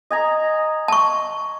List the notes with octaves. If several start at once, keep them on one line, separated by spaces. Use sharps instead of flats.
D#5 G#5 A#5
A5 C#6